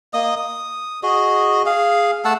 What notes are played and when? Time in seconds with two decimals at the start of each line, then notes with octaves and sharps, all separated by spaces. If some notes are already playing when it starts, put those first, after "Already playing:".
0.14 A#3 D#5 D#6
0.36 D#6
1.03 F#4 G#4 D#5
1.66 G#4 F5
2.25 A3 F#5 A5 E6